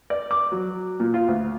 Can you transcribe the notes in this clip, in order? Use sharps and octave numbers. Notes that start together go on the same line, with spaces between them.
D5
D6
F#3
A#2
F4
D2